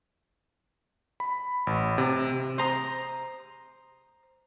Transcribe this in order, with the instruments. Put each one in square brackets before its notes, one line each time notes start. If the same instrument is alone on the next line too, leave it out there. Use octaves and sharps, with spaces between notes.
[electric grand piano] B5
A1
C3
[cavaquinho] C5 A#5 D#6